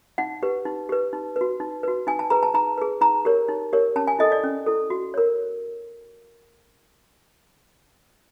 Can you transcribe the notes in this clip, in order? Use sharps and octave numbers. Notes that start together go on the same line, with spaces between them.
D#4 F#5
G4 B4
D#4
G4 B4
D#4
F#4 B4
D#4
F#4 B4
D#4 G#5
A5
G#4 B4 A#5
A5
D#4 A#5
G#4 B4
D#4 A#5
G4 A#4 C#5
D#4
G4 A#4 C#5
C#4 A5
G#5
E4 A4 D#5
D5
C#4
E4 A4
F#4
A#4 C#5